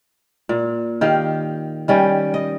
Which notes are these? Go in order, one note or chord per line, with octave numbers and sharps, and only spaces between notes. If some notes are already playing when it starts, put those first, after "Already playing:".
A#2
D#3 G4 F5
D#3 G3 C#4
D#5